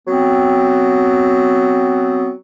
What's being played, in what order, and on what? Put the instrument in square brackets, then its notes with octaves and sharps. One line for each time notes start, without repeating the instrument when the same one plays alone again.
[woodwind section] F#3 B3 C4